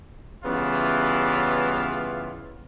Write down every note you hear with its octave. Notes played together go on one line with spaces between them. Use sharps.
C#3 E3 G3 B3 E4 F4